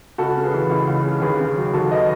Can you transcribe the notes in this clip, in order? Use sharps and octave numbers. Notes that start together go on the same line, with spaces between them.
C#2 F#4 A4
C#3
G#4 B4
E3
C#2
C#2
C#3
D#2 G#4 B4
C#3
F#3
D#2 F#4 A4
B4 D#5